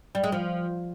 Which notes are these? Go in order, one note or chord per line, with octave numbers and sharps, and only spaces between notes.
G3
G#3
F3